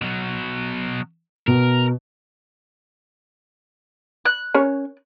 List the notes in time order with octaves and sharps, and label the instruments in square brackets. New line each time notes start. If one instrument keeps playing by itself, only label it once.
[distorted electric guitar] B2 F#3
[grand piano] B2 [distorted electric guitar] A#4
[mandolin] F#6
[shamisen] C#4 A#4 C#5